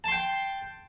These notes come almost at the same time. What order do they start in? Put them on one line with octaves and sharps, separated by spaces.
A5 C6 G5